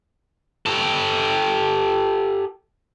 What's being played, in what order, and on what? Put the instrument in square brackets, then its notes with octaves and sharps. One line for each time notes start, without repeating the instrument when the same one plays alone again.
[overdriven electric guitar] G4 A4